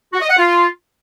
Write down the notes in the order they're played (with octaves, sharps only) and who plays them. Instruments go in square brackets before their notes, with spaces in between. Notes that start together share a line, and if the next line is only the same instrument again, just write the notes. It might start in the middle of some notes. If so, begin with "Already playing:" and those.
[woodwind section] F#4
D#5
F#5
F4